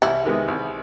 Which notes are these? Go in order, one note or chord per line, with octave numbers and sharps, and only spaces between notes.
C2 E3 E4
C3 D#3 G#3 B3
C2